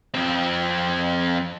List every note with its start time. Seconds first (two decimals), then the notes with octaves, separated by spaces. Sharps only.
0.14 F2 C4